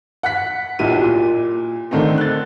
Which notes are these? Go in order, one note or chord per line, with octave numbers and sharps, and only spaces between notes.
F#5 F#6 B6
B1 A#2 E4 G4 D#7
A#2
D3 D#3 A3 C4 D#4
F#6 A6